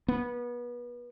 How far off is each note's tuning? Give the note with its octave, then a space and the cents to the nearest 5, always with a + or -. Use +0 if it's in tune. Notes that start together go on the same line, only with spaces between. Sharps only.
B3 -30